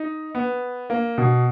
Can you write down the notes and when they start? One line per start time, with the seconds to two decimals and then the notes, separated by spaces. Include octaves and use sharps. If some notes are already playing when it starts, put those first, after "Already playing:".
Already playing: D#4
0.35 B3
0.90 A#3
1.18 B2